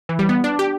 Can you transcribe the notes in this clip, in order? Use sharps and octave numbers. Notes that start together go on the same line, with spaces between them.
E3
G3
B3
D4
G4